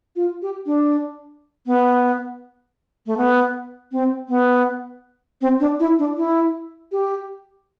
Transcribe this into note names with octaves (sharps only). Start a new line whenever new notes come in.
F4
G4
D4
B3
A3
B3
C4
B3
C4
D4
E4
D4
E4
G4